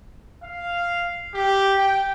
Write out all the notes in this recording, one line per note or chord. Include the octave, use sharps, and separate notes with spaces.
F5
G4
G5